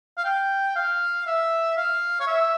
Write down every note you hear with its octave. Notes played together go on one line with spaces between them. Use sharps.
F5
G5
F5
E5
F5
C#5
E5